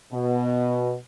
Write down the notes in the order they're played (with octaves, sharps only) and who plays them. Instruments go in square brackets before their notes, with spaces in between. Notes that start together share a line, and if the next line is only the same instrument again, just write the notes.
[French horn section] B2